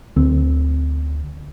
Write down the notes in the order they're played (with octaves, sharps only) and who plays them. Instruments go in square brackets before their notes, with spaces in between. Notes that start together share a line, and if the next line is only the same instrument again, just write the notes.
[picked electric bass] D2 C4